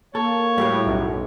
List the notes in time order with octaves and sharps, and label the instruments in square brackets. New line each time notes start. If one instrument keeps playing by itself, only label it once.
[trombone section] A#3 [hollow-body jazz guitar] A4 [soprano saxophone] C#5
[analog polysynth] A2 [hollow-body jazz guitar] G3 F#4 G4
[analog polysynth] B1 [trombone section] F#2